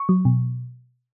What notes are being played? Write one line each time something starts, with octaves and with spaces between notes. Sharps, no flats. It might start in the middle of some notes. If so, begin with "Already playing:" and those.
Already playing: C#6
F#3
B2